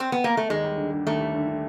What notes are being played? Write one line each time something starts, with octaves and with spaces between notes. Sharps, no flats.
C4
B3
A#3
A3
D#2 G#3
G3
D3
D3
D#2 A3
G3
D3
D3